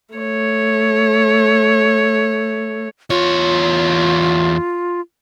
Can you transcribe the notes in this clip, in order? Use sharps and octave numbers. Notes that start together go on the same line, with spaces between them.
A3 C#5
E2 F4 C#5